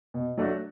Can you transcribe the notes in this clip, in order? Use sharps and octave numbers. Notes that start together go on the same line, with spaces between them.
B2
F#3 A3 D4 F#4